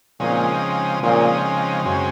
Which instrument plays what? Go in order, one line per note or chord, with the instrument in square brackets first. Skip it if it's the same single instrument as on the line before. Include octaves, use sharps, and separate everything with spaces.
[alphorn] A#2 [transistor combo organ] C#3 F3 G#3 C4 D#4
[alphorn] A#2 [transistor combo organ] C#3 F3 G#3 C4 D#4
[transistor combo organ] F#2 C#3 G#3 C4